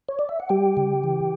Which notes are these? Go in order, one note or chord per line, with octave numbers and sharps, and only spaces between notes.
C#5
D5
E5
F#5
G3 G4 G5
C#3
E3